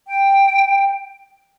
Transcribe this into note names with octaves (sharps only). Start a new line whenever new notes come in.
G5